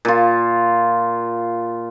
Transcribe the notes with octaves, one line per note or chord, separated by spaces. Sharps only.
A#2 F4